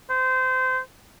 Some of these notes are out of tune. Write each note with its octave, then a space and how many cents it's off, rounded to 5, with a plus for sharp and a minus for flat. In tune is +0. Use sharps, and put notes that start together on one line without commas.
C5 -25